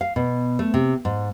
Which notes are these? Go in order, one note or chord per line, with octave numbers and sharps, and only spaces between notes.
F5
B2
A3
C3
G#2